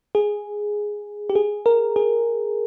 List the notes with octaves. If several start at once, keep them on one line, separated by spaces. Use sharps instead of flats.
G#4
G4
G#4
A#4
G#4